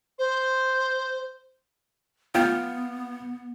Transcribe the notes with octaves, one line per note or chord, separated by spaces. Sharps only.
C5
B3 F4 G5